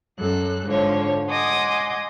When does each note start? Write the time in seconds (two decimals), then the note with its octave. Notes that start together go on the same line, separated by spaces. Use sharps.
0.18 F#2 A4 F#6
0.67 G#2 D3 F3 C#5
1.29 D#5 F#5 G#5 C6 D6 D#6